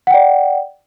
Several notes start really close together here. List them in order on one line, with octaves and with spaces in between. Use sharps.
F#5 G5 D5